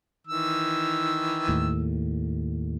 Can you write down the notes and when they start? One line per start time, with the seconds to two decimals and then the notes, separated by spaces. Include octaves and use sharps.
0.27 D#3 E3 E6
1.48 D#2 A2